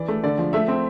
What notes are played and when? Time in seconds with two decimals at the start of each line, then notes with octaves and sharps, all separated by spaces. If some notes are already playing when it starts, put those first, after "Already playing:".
Already playing: E3 D5
0.08 A3
0.24 D3 D5
0.39 F3
0.53 A3 E5
0.68 C4